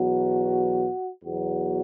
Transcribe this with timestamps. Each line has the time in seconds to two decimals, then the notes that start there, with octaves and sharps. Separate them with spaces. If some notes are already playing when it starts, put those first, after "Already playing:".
Already playing: E2 B2 F#3 F#4
1.25 E2 B2 F#3 F#4